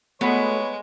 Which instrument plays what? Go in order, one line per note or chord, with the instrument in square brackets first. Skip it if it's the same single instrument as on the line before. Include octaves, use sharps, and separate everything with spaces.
[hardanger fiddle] G#3 [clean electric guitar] A3 F#4 [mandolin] B3 [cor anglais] C#5